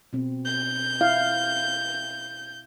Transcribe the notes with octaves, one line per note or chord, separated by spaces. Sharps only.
B2 C4
G6
E4 F5